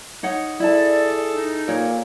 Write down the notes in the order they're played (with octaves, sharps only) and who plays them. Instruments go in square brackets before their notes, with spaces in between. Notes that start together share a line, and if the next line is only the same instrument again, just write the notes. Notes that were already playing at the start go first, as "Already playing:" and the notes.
[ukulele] D#4 C#5 F#5
[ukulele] E4 A5 [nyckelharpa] G#4 A4 [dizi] D5
[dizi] D#4
[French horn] A#2 [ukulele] A#4 C#5